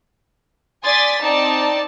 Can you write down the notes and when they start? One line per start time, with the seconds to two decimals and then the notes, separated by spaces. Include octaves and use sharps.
0.83 D5 G#5 C6 D#6 A6 B6
1.22 C4 D#4 D5 A5